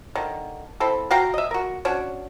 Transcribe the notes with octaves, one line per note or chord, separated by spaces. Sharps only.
D3 D#3
C4 E4 A4
F#4 F5 G5 A#5
D#5 E5
F#4 A#4
C#4 D4 F#4